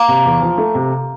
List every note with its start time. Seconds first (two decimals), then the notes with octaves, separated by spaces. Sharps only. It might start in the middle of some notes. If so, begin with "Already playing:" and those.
Already playing: A#3
0.08 C3
0.25 E2
0.42 F3
0.58 A3
0.75 C3